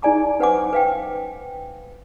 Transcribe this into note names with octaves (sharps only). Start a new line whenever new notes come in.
D#4 G#4 D5 G#5 A#5 D6
C#4 B4 C5 F#5 G#5 D6
B4 F5 G5